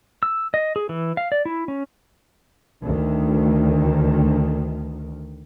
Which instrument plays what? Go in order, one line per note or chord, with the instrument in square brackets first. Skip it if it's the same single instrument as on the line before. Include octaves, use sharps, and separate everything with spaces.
[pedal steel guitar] E6
D#5
G#4
E3
F5
D5
E4
C#4
[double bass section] D2 D#3